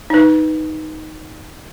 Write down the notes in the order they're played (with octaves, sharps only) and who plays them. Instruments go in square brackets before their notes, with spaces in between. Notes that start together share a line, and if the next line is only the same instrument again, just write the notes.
[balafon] D#4 B4